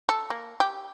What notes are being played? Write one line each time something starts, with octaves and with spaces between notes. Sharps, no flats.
A4
A#3
G4